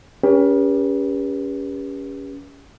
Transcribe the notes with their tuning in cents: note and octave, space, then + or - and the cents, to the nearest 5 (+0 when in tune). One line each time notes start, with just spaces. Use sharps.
C#4 +25 G4 +30 B4 -40